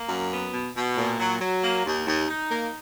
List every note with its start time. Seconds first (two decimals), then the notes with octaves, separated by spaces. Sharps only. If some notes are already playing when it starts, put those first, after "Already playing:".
Already playing: A#3
0.09 F#2
0.31 B3
0.53 B2
0.75 B2
0.97 A#2
1.20 F#3
1.41 F#3
1.63 A#3
1.86 D#2
2.07 D#2
2.29 D#4
2.51 A#3